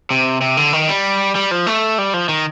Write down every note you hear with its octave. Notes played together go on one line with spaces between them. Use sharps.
C3
C3
D3
D#3
G3
G3
F3
A3
G3
F3
D#3